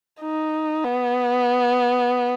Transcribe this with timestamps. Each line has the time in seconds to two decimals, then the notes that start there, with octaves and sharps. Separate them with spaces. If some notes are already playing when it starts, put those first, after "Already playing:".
0.21 D#4
0.85 B3